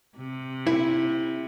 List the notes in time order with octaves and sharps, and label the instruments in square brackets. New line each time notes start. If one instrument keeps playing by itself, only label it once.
[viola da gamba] C3
[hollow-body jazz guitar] E4